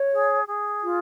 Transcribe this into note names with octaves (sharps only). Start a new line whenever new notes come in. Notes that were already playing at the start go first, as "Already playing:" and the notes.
Already playing: C#5
G#4
G#4
F4